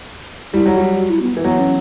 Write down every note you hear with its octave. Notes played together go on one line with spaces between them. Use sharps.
G3 E4
F#3
G3 F#4
F#4
E4
B3
E3
F#3 B3
C#4